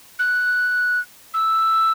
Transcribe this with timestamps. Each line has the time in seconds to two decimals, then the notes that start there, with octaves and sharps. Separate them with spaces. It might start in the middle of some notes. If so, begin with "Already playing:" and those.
0.19 F#6
1.34 E6